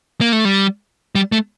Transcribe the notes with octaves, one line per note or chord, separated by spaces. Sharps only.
A#3
A3
G3
G3
A3